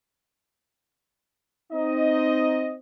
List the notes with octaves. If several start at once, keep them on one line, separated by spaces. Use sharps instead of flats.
C4 D#4 D#5